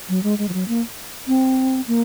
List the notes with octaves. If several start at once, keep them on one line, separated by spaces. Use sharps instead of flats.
F#3
G#3
G#3
F3
F#3
A#3
C4
A#3